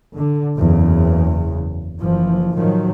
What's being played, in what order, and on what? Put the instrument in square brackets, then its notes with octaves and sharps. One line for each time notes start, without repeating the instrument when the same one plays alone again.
[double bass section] D3
F#1 E2 C#3
F#1 E3 F3
A2 D#3 F3 F#3